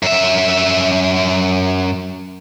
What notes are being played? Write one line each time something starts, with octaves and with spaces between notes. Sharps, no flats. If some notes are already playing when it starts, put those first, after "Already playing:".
F#2 E5